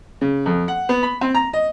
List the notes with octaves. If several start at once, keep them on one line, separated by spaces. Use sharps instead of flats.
C#3
F2
F#5
B3
B5
C4
A#5
D#5